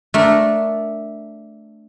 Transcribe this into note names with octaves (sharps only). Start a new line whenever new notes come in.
A3 D4 A#4